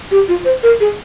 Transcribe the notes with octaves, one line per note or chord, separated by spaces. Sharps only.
G4
F4
C5
A#4
G#4